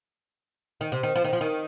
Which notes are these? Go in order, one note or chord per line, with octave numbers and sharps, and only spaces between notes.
D#3
C3
D#3
F3
D#3
F3
D#3